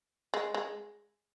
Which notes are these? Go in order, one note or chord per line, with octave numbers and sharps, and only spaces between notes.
G#3
G#3